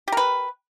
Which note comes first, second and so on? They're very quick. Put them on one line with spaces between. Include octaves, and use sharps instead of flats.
G4 A#4 B4